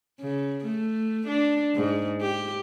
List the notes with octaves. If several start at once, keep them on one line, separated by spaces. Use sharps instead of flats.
C#3
A3
D4
G#2
G4